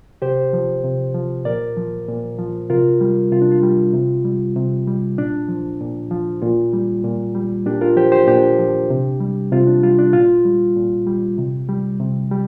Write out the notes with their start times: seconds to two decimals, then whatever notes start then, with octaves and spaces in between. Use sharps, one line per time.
0.22 C3 G4 C5
0.53 F3
0.84 C3
1.15 F3
1.45 A#2 A#4 D5
1.77 F3
2.08 A#2
2.39 F3
2.70 C3 F4 A#4
3.01 G3
3.31 C3 F4
3.42 D4
3.52 F4
3.63 G3
3.93 C3
4.25 G3
4.56 C3
4.87 G3
5.18 A#2 D4
5.49 F3
5.80 A#2
6.11 F3
6.42 A#2 F4
6.73 G3
7.04 A#2
7.35 G3
7.66 A#2 D4 G4
7.81 F4 A#4
7.96 F3 G4 C5
8.12 G4 C5
8.28 A#2 D4 G4
8.59 F3
8.90 C3
9.20 G3
9.52 C3 F4
9.67 D4
9.83 G3 F4
9.99 D4
10.13 A#2 F4
10.45 G3
10.76 A#2
11.06 G3
11.38 C3
11.69 G3
12.00 C3
12.31 G3